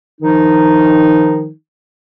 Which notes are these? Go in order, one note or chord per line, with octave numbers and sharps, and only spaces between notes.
D#3 F3 D#4